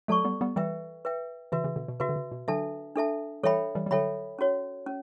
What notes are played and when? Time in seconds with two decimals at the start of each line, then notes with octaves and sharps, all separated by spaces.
0.08 F#3 A3 A4 D5 A5 C#6
0.25 G3 B3
0.41 G3 B3
0.56 E3 G3 B4 E5 G5
1.05 B4 E5 G5
1.52 C#3 E3 F#4 B4 E5
1.64 C#3 E3
1.76 B2 D3
1.88 B2
2.00 C#3 F#4 B4 E5
2.09 D3
2.16 C#3
2.32 B2
2.48 D3 F#3 D4 A4 E5 A5
2.96 D4 A4 E5 A5
3.43 E3 G3 A4 C#5 E5 G5 B5
3.75 E3 G3
3.86 G3
3.91 D3 F#3 A4 C#5 E5 G5 B5
4.39 C#4 F#4 C#5
4.86 C#4